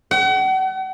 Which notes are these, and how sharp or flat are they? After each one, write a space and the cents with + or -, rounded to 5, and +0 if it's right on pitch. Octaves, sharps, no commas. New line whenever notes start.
F#5 +40